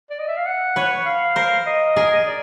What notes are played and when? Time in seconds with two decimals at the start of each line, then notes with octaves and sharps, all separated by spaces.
0.10 D5
0.19 D#5
0.28 E5
0.37 F5
0.46 F#5
0.76 B4 C#5
1.06 F5
1.36 A#4 C5
1.66 D#5
1.96 G#4 A#4
2.27 D5